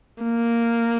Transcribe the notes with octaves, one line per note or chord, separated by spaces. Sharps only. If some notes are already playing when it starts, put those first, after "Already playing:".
A#3